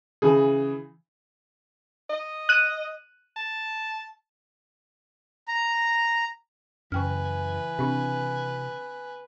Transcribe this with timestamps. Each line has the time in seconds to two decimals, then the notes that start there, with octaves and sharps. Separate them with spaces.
0.22 C#3 E3 G#4
2.10 D#5
2.49 F#6 D#7
3.36 A5
5.48 A#5
6.92 F#2 C#3 E3 B4 G5 G#5 F6
7.79 C3 C4 D4